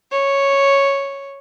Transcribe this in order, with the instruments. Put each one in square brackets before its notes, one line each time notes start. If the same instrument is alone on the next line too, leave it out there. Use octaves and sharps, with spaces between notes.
[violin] C#5